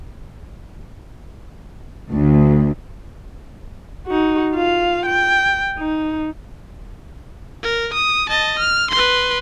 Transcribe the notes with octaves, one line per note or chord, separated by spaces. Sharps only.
D2
D#4 F#4
F4 F5
G5
D#4
A#4
D#6
D#5 A5
F6
B4 C6